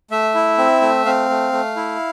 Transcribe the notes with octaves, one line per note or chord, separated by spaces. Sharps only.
A3 E5
E4
C4
A3
C4 F5
A3
A3
E4